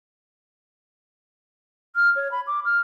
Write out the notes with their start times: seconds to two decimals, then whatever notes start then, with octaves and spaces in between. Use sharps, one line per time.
1.96 F6
2.16 C#5
2.31 B5
2.47 D6
2.65 F6